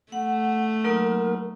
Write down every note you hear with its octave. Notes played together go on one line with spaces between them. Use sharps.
A3 F#5
F#3 A#3 D#4 A#4